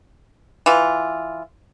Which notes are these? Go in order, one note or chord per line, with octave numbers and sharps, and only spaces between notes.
E3 F4